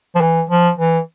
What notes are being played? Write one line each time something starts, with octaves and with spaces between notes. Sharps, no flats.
F3
E3
F3
E3